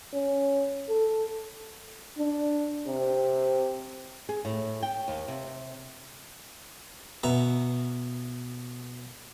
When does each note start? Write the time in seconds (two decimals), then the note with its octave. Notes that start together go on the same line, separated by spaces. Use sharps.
0.13 C#4
0.89 A4
2.18 D4
2.88 C3
4.29 G#4
4.45 A2
4.83 G5
5.08 D#2
5.28 C3
7.23 B2 E5 A#5